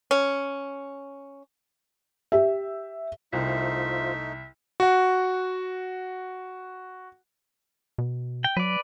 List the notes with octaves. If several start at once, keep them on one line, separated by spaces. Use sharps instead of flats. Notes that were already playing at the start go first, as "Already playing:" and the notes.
C#4
G4 E5
C2 A3 D#4 F4 C5 E5
F#4 F#5
B2
G5
F#3 B4 D5